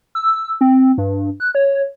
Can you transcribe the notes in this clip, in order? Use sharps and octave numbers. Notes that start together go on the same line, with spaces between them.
E6
C4
G2
F#6
C#5